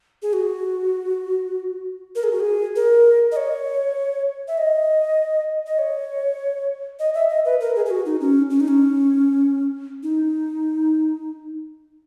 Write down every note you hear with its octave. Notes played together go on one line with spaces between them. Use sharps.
G#4
F#4
A#4
G#4
F#4
G#4
A#4
D#5
C#5
E5
D#5
D#5
C#5
D#5
E5
D#5
B4
A#4
G#4
G#4
F#4
D#4
C#4
C#4
D#4
C#4
D#4